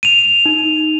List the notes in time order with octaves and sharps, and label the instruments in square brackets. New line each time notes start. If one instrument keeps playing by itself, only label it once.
[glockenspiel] D#7 F7
[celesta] D#4